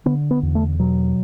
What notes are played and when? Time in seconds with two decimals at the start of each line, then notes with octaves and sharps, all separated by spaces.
0.06 D3 B3
0.31 B3
0.43 E2
0.55 A3
0.79 B2 F#3